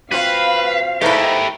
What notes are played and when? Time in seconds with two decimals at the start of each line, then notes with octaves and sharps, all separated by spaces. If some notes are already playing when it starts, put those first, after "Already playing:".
0.12 C4 F4 F#4 B4 F5
1.01 G#2 A3 E4 G4 A#4 B4